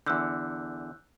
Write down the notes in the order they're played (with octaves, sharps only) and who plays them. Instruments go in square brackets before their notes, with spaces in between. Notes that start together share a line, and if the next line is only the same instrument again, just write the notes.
[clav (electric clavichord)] E2 D3 [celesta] E6 F#6 G6